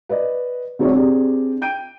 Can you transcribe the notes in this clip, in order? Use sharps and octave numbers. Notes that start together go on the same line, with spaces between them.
B4 D5 D#5
D3 F#3 G#3 C4 C#5 D5
C4 D4 G4 G#4
G5 G6 D7 D#7